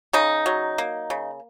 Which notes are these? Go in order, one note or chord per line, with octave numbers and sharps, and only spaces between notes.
C#3 D#4
F#3
A#3
C#3